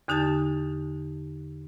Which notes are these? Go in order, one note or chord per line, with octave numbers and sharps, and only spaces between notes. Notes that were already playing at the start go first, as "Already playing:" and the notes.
E2 D3 D#4 G4 A5 A6